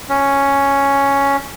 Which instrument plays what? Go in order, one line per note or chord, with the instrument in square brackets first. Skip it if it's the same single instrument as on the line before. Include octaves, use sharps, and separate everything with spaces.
[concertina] C#4